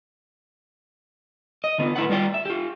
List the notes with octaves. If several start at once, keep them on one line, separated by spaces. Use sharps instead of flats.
D#5
D3 B3 E4 F4
A2 E4 B4 F#5
G3 F4 D5 G5
E5
F4 G4